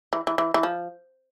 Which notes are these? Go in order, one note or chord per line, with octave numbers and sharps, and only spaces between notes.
E3
E3
E3
E3
F3